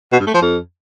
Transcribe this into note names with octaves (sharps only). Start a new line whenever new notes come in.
B2
G2
A3
F3
F2